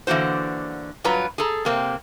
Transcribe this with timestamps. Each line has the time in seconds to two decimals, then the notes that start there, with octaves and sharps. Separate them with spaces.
0.07 D3 E3 A#3 F#4 C5
1.04 G2 F#3 F4 B4 A#5
1.38 G#4 A4 A#5
1.65 C3 A#3 C4